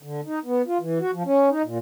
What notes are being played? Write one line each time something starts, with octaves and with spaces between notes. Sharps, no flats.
D3
D#4
B3
F4
E3
F#4
F3
C#4
D#4
A#2